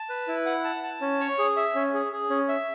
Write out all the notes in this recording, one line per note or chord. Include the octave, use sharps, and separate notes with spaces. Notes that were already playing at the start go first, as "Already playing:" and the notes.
Already playing: A5
B4
E4
F#5
A5
A5
C#4
C#5
G#4
E5
C#4
G#4
G#4
C#4
E5